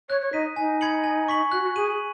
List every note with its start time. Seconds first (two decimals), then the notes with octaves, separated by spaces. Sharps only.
0.09 C#5 F#6
0.21 C#5
0.33 D#4 B6 D#7
0.56 D#4 G#5
0.81 B5 G#6 C#7 F#7
1.04 G#5
1.28 C#6 B6 F#7
1.52 F#4 F#6
1.63 F#4
1.76 G#4 D#7 F#7